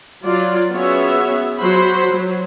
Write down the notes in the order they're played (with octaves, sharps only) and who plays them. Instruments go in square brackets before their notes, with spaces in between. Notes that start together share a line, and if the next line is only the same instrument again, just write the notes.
[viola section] F#3 F4 D5
B3 C#4 F#4 G#4 C#5 E5
F#3 F#4 C5 B5
F#3